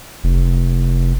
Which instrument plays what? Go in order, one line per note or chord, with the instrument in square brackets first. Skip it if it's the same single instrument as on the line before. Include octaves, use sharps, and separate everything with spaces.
[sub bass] F1